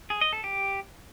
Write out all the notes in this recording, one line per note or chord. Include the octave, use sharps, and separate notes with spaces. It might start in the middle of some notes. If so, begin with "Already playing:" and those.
G#4
D#5
A4
G4